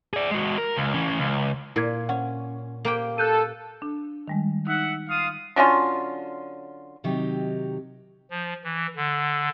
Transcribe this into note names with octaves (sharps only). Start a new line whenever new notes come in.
G#4 D5
G#3 F#4
A#4
C#2
E3 C#4
C#2
A#2 E4 G#6
C#4 F#5
A#3 G4 G5
A4 F#6 G6 D#7
D4
D#3 G3 G#3
D#4 E5 F#5
F4 F5 D#6
D3 F#3 C#4 F4
C3 D#3 F#3 D#4 G4
F3
E3
D3